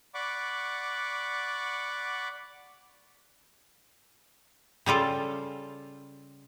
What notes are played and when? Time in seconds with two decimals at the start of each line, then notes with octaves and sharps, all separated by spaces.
0.14 D5 F#5 B5 C#6 D6
4.86 C#3 G3 F4 A4